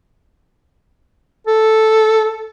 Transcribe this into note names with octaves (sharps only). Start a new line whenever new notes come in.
A4